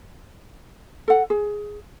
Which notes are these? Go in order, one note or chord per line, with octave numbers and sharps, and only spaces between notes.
A4 F#5
G#4